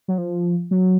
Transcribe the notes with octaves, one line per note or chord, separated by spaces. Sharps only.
F#3
F3
F#3